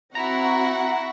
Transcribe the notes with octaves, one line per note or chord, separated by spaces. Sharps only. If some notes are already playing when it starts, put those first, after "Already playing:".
C4 E4 F#4 F#5 A#5 C#6 A#6